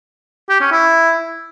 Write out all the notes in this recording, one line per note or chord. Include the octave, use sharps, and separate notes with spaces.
G4
C#4
E4